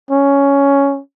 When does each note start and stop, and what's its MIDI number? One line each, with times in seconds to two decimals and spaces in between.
0.11 1.00 61